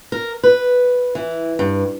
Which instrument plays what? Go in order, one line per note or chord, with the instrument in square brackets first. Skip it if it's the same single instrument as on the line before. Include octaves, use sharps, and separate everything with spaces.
[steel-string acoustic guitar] A#4
B4
E3
G2